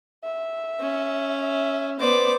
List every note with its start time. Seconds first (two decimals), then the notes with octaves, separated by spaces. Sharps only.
0.24 E5
0.80 C#4
1.41 E5
1.99 B3 C5 D5 D6